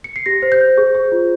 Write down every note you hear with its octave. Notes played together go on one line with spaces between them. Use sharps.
C#7
C7
G4 A#6
C5
G6
C5
G#4
G#4
F4